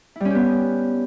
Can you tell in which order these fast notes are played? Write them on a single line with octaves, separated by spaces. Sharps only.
E4 G3 C#4 G4 B3